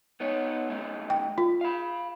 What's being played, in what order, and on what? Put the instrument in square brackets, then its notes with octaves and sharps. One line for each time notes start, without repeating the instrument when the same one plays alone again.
[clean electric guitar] B3 D#4 C#5
A3 C#4 D#4
[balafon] G5
F4
[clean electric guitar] F5 B5